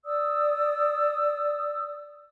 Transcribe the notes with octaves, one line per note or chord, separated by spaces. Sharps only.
D5 D#6 E6